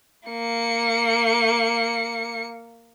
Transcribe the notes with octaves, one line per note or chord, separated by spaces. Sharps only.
A#3 C#7